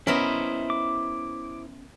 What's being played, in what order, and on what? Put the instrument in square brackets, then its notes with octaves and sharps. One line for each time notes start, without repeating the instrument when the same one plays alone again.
[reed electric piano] B3 C#4 [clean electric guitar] E4 C5 D#5 [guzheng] A#4 E5 B5
[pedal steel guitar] D6